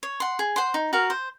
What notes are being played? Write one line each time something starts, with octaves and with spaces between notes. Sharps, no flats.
C#5
F#5 C6
G#4
C5 F#5 C6
D#4
F#4 A#4 F5
C5